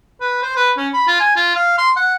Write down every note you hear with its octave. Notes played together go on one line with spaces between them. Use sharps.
B4
C5
B4
C#4
B5
F4
G#5
F4
F5
C6
F#5